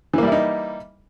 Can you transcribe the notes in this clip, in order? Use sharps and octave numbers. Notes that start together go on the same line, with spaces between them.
E3 G3 A#3 D#4 E4